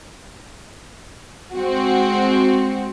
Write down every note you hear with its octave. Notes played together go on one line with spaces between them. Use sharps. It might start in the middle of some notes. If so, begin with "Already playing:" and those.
G#3 C4 F#4